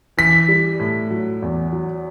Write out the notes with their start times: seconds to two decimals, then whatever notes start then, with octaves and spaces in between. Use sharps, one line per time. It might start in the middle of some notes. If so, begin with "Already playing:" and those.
0.17 E3 B6
0.48 G3
0.79 A2
1.10 F#3
1.42 E2
1.72 F#3